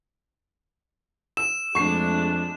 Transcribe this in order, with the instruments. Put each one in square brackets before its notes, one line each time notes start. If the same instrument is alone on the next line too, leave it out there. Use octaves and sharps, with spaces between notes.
[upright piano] E6 [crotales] E7
[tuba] F2 [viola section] G#3 A3 D4 [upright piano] C#6 C7